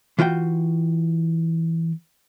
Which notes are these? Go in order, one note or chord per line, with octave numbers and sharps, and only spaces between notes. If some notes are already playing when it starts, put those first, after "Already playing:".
E3 F4 F#4 G5